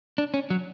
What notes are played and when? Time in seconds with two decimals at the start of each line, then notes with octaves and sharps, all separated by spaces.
0.18 D4
0.34 C#4
0.50 F#3